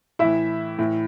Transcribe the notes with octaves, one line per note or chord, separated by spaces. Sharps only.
A2 E3 E4 E5
A2 E3